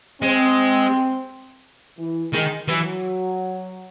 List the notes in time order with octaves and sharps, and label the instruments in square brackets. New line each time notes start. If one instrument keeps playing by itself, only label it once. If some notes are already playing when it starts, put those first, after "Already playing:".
[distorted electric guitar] G#3 [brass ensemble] C4
[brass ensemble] E3
[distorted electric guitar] D#3 [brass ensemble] G#3
[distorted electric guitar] E3 [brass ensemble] F#3